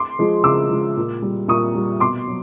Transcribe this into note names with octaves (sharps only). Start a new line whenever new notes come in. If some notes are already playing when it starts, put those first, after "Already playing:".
Already playing: C6 D6
F3 G#3
C#3 D6 E6
F3 G#3
A#2
G3
A#2 C#6 D#6
G3
B2 C6 D6
F#3